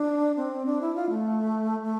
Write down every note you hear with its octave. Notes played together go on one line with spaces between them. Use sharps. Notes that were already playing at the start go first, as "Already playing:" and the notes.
Already playing: D4
C4
D4
E4
F4
A3
A3